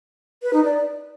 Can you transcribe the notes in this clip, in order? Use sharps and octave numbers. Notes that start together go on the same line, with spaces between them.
B4
D#4
D5